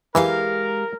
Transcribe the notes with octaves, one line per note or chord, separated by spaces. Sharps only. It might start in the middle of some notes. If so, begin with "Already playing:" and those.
E3 G#3 G4 A#4 F5